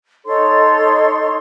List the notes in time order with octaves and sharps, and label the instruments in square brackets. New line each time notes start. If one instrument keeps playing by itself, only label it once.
[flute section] D#4 A4 C#5 C6